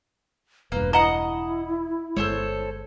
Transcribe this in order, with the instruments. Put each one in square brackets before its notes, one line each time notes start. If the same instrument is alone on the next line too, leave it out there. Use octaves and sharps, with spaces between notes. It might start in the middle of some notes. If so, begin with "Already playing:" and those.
[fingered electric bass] E1 G2 [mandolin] A#3 [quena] B4
[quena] E4 [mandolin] D#5 F#5 D#6 [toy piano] A#5
[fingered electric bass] G1 G#3 [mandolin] A4 C5 C#5